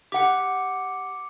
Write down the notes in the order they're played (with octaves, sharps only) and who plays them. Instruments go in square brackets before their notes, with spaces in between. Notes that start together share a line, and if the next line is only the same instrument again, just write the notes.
[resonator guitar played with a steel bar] G4 F#5 [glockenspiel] D6 C#7